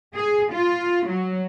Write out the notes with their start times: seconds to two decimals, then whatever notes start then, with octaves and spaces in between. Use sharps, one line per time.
0.16 G#4
0.53 F4
1.08 F#3